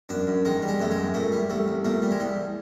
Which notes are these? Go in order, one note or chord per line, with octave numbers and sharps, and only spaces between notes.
F#2 D4
F#2
D#3 G#3
G3
G#3
F#2 A3
G#3
F#2
A#2 A3
G3
C2 A3
C2
A#2 A3
G3
G#3
C2 G3